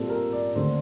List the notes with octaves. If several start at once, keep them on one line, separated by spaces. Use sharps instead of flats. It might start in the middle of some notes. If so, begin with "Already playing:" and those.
Already playing: A#2 G3 C4 A4
A#4
D5
D#2 D3 A3 C4 C5